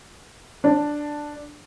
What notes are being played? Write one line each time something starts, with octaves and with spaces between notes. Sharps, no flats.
D4